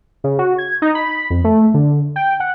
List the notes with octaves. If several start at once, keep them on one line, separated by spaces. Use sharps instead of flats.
C#3
F#4
G#6
D#4
B5
F2
A3
D3
G5
F#5